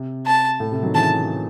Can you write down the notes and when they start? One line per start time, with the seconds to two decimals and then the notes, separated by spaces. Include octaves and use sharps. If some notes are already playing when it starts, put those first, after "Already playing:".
Already playing: C3
0.26 A5
0.60 A2
0.72 C3
0.83 D#3 F#3
0.95 C#3 E3 A5